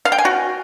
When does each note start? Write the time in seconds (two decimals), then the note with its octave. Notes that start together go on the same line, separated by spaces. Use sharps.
0.05 F5
0.12 G5
0.18 G#5
0.25 F#4